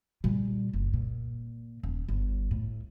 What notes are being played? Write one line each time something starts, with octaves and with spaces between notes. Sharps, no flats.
A#2 G3
F#1
A#2
D#1
G1
A2